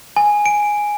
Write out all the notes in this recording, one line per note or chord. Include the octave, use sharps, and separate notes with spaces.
G#5
D7